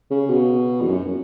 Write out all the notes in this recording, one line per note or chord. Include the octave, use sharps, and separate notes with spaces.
C#3
B2
E2
F#2